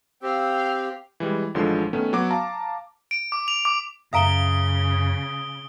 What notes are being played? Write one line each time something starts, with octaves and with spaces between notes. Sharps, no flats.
C4 G4 C5 F5 G5 E6
E3 G3 G#3
A1 D3 F3 G#3 C6
D#3 A3 B3 C#4
F#3 B3 F#5 D6
F5 A5 A#5
D7
D6
F7
D6
F#2 C#3 E5 F5 A#5 D#6 D7 G7